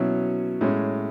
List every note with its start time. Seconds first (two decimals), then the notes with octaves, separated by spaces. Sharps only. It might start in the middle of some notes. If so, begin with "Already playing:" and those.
Already playing: B2 F#3 C#4 E4
0.61 A2 G#3 C#4